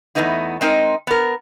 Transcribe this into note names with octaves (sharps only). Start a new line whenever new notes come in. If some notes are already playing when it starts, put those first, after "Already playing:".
E2 B2 A3 B3 D#4 E4
G#3 C4 D#4 A#4
B3 A#4